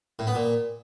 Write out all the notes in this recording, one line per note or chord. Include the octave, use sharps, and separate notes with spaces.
A2
B3
A#2